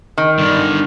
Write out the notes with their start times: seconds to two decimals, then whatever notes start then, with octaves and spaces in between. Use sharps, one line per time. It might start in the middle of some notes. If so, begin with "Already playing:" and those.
0.18 D#3
0.38 G2 D3